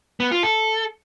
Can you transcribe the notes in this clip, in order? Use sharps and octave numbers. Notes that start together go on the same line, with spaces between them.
B3
F4
A4